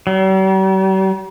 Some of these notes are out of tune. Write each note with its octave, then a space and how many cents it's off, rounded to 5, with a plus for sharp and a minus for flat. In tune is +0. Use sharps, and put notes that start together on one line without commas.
G3 -45